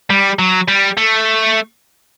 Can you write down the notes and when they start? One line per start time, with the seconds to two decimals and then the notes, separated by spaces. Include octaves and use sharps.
0.10 G3
0.39 F#3
0.68 G3
0.97 A3